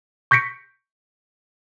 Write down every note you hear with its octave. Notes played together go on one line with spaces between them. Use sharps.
C#6 G6 A#6 B6 C#7 D7